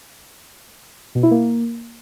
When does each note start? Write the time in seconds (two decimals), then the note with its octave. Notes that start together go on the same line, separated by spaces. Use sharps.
1.15 B2
1.23 E4
1.31 A#3